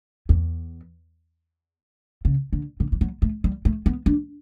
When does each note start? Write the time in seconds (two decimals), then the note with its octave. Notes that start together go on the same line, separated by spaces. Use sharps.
0.29 E2
2.25 C#3
2.53 D3
2.80 D3
2.92 E3
3.01 F#3
3.22 A3
3.44 G3
3.65 A3
3.86 B3
4.06 D4